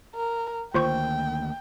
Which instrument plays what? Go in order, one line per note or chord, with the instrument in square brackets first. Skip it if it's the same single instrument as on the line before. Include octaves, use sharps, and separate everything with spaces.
[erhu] A#4
[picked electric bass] D2 D#3 A#3 [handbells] F4 C5 C#6 [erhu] G5